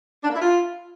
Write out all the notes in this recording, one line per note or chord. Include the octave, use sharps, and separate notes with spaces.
D4
A#3
E4
F4